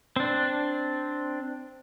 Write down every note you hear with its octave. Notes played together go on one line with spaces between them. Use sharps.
C4 D4